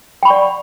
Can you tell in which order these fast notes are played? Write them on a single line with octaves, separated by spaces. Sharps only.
G5 B5 C#6 D5 F#5